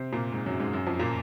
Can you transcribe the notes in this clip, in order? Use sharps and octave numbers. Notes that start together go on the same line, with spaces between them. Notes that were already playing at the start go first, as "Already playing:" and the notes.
Already playing: C3 C4
A#2 A#3
G#2 G#3
F#2 F#3
G#2 G#3
F#2 F#3
F2 F3
A#2 A#3